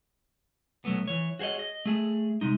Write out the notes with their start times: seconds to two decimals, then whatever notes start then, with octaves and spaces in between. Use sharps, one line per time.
0.85 B1 F#3 A3 B3
1.07 E3 C#5
1.39 F#4 G#4 C5 C#5 D#5
1.59 D#5
1.86 A3 G#4
2.41 C3 G#3 D#4